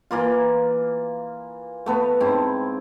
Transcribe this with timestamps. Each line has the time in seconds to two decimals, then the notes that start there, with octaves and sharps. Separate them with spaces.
0.11 E3 A#3 F4
1.86 A3 B3 B4
2.20 G#2 C4 E4